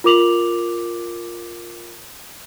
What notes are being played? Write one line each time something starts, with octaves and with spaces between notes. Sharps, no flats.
F4 A#4 D6 F7 F#7